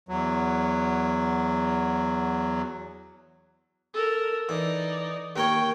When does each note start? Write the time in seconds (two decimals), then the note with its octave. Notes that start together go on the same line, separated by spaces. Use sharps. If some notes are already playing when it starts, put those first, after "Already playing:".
0.09 E2 F#3
3.94 A4 A#4
4.49 E3 D#4 D5
5.36 D#2 A#4 C#5 G5